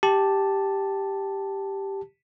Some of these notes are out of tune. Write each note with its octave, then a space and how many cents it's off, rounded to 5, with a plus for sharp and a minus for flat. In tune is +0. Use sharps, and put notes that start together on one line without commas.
G4 +0 A5 +0